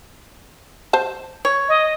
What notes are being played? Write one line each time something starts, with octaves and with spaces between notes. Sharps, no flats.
C5 A5
C#5
D#5